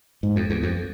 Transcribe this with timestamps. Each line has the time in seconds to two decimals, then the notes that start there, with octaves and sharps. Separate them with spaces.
0.23 G#2
0.36 F2
0.50 E2
0.63 F2